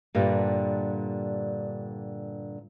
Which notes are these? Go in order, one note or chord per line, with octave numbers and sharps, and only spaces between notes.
G2 A#2 D3 G3